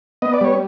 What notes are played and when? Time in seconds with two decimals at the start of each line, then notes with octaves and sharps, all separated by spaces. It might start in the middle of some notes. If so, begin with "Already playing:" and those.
0.22 B3 D#5
0.34 D5
0.41 G3 C#5